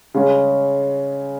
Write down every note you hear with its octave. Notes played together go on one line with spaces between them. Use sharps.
C#3 G#3 C#4